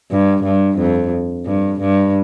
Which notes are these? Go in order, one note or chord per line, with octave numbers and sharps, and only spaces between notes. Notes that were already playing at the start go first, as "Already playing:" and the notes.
G2
G2
F2
G2
G2